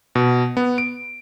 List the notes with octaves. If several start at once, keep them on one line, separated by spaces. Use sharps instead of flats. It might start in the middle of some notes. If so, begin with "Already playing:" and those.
B2
B3
D7